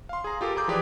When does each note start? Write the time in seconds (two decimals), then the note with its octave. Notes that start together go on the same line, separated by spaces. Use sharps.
0.09 F5 C6
0.24 G#4 A#5
0.41 F4 G4 A4 A#4
0.56 G#4 A#5 D6 G6
0.68 E3 F3 G4 G#4 B4 D5